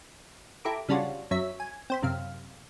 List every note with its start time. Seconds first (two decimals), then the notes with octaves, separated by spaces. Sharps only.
0.65 E4 G4 A4 A#5 D6
0.89 C#3 G3 C#4 D4 F4 F#4
1.31 F#2 F#3 C#5 E5 B6
1.60 G#5
1.90 C4 C5 B5
2.02 F#2 C3 F5